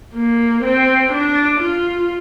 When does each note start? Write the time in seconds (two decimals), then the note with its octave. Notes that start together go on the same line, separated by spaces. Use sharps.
0.14 A#3
0.63 C4
1.12 D4
1.60 F4